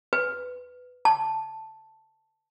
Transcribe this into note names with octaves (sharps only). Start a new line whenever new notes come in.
B4
A5